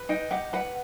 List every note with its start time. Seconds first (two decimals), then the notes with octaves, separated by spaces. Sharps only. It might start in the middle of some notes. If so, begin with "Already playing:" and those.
Already playing: B4
0.09 D#4 G5
0.31 G4 F#5
0.53 B4 F#5